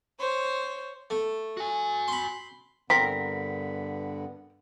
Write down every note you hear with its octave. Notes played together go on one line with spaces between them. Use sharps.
C5 C#5
A3
F#4 G#5
B5 C6
G2 D3 B3 C4 A#4 B6